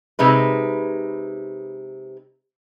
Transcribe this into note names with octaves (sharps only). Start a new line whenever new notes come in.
C3 G#3 D#4 B4